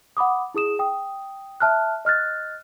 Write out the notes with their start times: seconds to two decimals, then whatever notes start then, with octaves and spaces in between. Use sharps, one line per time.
0.17 F#5 B5 D6 D#6
0.54 E4 G#4 D#6 E7
0.79 G5 D#6
1.60 E5 A5 F6 F#6
2.05 D#5 F6 F#6 A6